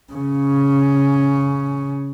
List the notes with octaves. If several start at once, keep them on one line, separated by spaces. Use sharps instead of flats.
C#3 C#4